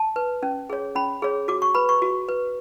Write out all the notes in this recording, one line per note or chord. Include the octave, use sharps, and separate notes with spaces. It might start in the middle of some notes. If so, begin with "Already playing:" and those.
Already playing: A5
B4
C#4
G#4 C#5
C#4 B5
G#4 C#5
F#4 D6
C#6
B4 B5
C#6
F#4
B4